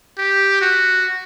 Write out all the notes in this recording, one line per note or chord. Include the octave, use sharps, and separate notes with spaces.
G4
F#4